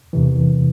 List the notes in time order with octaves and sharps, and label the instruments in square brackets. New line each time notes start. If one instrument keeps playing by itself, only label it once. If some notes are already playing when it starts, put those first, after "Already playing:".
[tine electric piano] E2 C3 E3